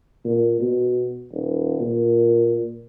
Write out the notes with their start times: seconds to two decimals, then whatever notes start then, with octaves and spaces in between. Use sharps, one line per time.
0.25 A#2
0.61 B2
1.32 D#1
1.80 A#2